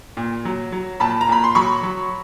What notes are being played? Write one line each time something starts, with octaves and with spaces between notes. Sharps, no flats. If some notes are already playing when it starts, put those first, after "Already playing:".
A#2
F#3
F#3
A#2 A5 B5
A#5
A#2 B5
C6
F#3 B5 C#6
F#3